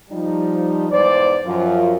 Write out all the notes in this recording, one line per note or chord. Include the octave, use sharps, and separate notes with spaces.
F3 G3 D#4
E2 G#2 C5 D5
F#2 F3 F4